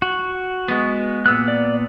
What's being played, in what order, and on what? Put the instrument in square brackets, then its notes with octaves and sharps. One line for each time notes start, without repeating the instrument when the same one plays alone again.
[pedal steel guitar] F#4
[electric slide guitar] G#3 B3
[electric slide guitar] A#2 B3 [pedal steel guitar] E6 F#6
[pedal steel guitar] D5